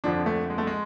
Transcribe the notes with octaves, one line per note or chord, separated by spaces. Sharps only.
F2 D3 F3 D4
A3
G#3
A3
G#3